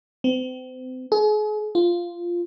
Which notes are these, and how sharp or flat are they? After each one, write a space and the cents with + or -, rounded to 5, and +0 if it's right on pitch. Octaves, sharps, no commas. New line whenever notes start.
C4 -35
G#4 +40
F4 -5